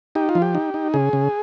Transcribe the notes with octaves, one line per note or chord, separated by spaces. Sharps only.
D#4 G4
F4
F3
G4
D#4
D#4
C#3 G#4
C#3